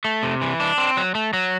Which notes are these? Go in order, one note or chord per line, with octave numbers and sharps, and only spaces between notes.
A3
C3
E3
D4
C4
F#3
A3
F#3